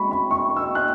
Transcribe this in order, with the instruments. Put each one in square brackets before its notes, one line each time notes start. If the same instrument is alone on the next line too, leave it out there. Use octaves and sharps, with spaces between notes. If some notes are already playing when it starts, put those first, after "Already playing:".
Already playing: [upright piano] G#3 B5 C#6
B5
C#6
E6
F#6